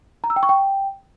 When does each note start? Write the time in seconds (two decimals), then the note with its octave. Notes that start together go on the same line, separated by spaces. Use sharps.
0.24 A#5
0.30 E6
0.36 G5
0.43 C#6
0.49 G5